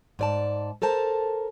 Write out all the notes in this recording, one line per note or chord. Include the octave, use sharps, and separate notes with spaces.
G#2 D5 A5
A4 A#4 C5 A5 A#5